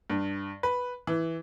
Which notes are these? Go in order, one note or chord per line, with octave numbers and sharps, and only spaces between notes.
G2
B4
E3